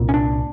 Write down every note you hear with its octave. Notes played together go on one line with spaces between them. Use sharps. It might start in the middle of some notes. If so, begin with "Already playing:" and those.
Already playing: C2 A#2
C#4
D4